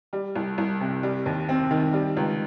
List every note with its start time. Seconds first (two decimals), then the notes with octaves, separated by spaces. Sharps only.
0.13 G3
0.35 C2
0.58 C2
0.80 C3
1.03 G3
1.26 D#2
1.49 C4
1.71 D#3
1.93 G3
2.17 C#2